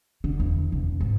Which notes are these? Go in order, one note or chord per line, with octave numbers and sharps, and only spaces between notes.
D3
E2
E1
G#2